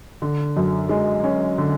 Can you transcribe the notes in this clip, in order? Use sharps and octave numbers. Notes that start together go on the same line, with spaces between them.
D3
F#2
G#3
C#4
D3